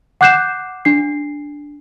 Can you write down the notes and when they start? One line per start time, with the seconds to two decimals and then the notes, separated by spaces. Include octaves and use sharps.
0.21 F#5 D6 F#6 G6 C7 E7
0.85 D4 C7